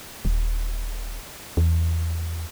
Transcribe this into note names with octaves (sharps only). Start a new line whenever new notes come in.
D#1
E2